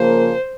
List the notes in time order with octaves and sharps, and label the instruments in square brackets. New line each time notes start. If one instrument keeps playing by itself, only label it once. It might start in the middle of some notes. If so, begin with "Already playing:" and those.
Already playing: [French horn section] C#3 F3 A#3 [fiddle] C5